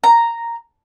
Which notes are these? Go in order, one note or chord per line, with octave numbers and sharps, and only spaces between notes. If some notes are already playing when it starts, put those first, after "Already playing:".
A#5